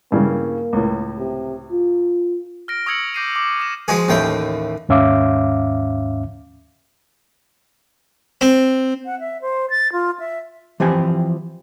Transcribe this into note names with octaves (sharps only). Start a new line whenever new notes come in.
G2 C#3 E3 A#3
C#2 A2
C3
F4
F6 A#6 D7
C#6 D#6 E6 G#6 C#7 F#7
D6 G6 A#6 C7 D7 D#7
D6
D#6 A#6 E7
F3 G#3 F#4 G#4
A1 D#2 A3 G5
D#2 G#2 C#4 E5 F5 D6
C4
F#5
E5
C5
A6
F4
E5
E3 F3 C4 G4 C5 G#5